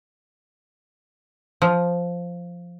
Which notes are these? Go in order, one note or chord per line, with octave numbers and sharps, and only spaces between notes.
F3